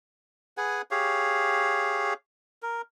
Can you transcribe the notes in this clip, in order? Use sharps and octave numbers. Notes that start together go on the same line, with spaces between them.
G#4 B4 F#5 G#5
G4 G#4 C#5 F5
A#4